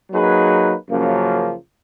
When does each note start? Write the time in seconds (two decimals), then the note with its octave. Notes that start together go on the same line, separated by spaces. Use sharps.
0.11 F#3 A#3 D#4 G#4 B4
0.89 F#2 C#3 F3 A#3